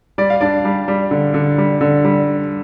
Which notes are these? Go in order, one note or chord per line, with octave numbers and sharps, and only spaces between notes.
G3 D5
F5
G3 D4 D5
G3
G3
D3
D3
G3
D3
G3